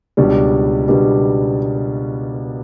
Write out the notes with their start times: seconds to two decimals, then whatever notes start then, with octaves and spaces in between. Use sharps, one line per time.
0.17 C#2 B2 G3 D4
0.88 C#2 B2 G3 D4